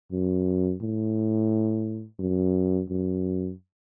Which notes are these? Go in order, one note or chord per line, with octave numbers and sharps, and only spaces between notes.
F#2
A2
F#2
F#2